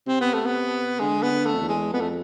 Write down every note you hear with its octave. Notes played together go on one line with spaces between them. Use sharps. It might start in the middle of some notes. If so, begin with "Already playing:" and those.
C3 C4
B3
A3
B3
D3 G#3
B3
D3
A3
F2
E2
G#3
F2 B3
A3